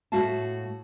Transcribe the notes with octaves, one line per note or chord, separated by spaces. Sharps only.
A2 A3 F#4 E5 F5 A5